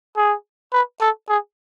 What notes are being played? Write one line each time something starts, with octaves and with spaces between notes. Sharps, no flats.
G#4
B4
A4
G#4